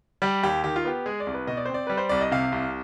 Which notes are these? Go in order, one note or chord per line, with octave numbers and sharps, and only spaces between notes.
G3 G4
D#2 G4
D#3 G4
F4
B3 G4
G#3 G#4
D5
C2
B4
B2 D#5
D5
C5
C4 D5
G3 B4
C5
C2 D5
D#5
C3 F5
C2